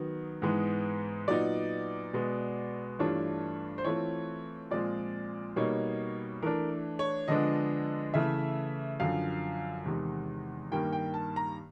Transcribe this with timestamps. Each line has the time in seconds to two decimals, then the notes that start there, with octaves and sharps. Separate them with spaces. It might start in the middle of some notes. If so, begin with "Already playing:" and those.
Already playing: D#3 F#3 B3
0.42 G#2 E3 G#3 B3
1.28 A#2 F#3 B3 D#4 D5
2.13 B2 G#3 B3
2.99 G2 E3 A3 D4 F4 C#5
3.78 C5
3.84 E3 A3 C4 F4 C#5
4.71 A#2 F3 G#3 C4 F4 D5
5.56 B2 G3 A#3 D#4 C#5
6.42 E3 A3 D4 A#4
6.99 C#5
7.28 D3 F3 G#3 B3 D4 D#5
8.14 C#3 E3 A3 E5
9.00 F#2 D3 F3 F5
9.85 E2 C3 D#3 G#3
10.71 G2 D#3 G3 A#3 G5
10.93 G5
11.14 A5
11.36 A#5